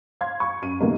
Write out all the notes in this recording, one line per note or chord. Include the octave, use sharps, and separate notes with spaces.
F5 C6 G#6
C#6
F#2 D#7
B2 D#3 G3 A3 A#3 D#4